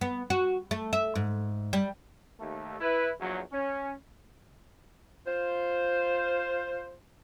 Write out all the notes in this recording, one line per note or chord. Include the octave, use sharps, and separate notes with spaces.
B3
F#4
A3
E5
G#2
G3
D#2 A3
E4 B4
A#1 E2 F#3
C#4
F4 C5